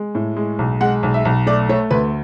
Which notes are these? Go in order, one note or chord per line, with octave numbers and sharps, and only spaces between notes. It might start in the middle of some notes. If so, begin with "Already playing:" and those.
Already playing: G#3
A2
G#3
B1
G#3 F#5
B1
E5
B1
A3 D5
A3 C#5
D2 B4